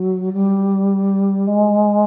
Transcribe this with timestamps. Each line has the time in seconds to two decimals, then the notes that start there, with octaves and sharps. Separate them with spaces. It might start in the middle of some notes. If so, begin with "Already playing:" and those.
Already playing: F#3
0.33 G3
1.47 G#3